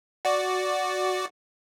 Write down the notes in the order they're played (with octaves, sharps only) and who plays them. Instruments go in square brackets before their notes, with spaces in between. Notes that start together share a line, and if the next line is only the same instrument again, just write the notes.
[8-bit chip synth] F#4 D5